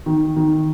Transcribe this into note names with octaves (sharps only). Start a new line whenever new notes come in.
D#3
D#3